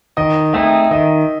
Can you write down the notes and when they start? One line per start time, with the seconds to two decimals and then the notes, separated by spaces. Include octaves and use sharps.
0.17 D#3 D#5
0.54 A3 C4 D#4 G#4 E5
0.91 D#3 D#5